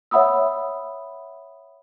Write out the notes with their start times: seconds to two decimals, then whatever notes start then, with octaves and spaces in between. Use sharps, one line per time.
0.11 C#5 E5 F#5 B5 D#6 E6